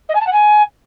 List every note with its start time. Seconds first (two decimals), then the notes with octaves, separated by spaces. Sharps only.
0.09 D#5
0.15 G#5
0.21 A5
0.27 F#5
0.32 G#5